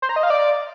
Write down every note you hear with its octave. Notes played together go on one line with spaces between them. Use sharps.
C5
A#5
D#5
F5
D5